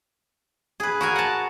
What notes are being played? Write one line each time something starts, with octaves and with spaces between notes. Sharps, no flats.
G#4 B4
F#4 A#4 G#5
F#5 A5